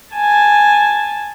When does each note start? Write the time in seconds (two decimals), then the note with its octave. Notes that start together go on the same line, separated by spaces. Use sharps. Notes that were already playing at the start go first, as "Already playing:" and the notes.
0.15 G#5 A5